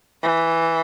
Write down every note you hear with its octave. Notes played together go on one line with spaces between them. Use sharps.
E3